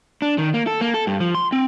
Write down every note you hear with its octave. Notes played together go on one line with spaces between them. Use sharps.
D4
D#3
A#3
A4
A#3
A4
G2
F3
C6
C4